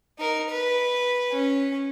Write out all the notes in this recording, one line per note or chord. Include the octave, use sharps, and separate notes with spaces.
D#4 A#4
B4
C#4